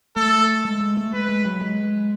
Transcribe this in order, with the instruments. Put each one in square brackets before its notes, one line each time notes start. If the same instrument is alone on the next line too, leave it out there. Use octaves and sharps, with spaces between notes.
[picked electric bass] A3 [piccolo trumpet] A4
[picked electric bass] G#3
G#3
A3
[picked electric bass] G#3 [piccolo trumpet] B4
[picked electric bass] G#3
F#3
G#3